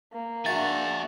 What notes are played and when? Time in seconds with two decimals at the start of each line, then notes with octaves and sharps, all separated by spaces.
0.13 A#3
0.46 D4 F#4 G#4 E5 A6